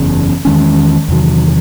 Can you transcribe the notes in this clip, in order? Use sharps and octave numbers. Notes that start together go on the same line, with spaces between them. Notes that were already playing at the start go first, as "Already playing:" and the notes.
Already playing: F#1 E2 C#3
E2 D#3 G#3 C#4
E2 C3 D#3 F#3